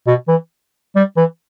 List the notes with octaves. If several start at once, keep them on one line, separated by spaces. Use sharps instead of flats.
B2
E3
G3
E3